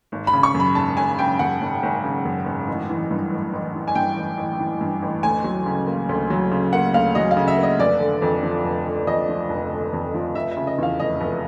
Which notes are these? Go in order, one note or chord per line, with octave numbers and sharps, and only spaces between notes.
G#1
B5
C#3
C#6
F#2
B5
G#1 A5
G#1 G#5
C#3 G5
F#2 F#5
G#1
G#1
C#3
F#2
G#1
A1
E3
G2
A1
A1
E3
G#5
G2 G5
A1
A1
E3
G2
A1
D2 G#5
F#3
C#3
A#3
D2
F#3
C#3
A#3 F#5
D2 F5
F#3 D#5
F5
C#3
E5
A#3
D#5
F1 D5
D3
F2
F3
F1
D3
F2 D#5
F3
F1
D3
F2
F3
F1 E5
E5
C#3
D#5
E2 F5
F1 D#5
F1